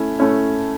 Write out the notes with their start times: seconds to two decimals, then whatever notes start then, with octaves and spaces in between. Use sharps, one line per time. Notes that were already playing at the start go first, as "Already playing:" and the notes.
Already playing: A3 C#4 E4
0.19 A3 C#4 E4